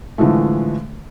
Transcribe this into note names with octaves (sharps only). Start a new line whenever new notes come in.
A2 D3 E3 F3 G#3 A3